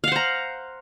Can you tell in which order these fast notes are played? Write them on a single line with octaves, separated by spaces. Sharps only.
F5 F#5 C5 A#5